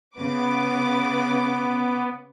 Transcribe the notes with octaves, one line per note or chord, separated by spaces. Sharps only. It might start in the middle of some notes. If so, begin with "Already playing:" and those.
C#3 B3 B4 D6